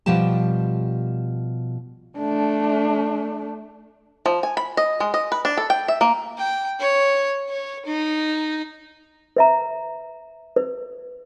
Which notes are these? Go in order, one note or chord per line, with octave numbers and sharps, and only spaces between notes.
B2 F3 G3 G4 A5
A3 D4
F3
G#5
B5
D#5
G#3
D#5
B4
D4
A4
G5
E5
A#3
G5
C#5
C#5
D#4
B4 E5 A#5
B4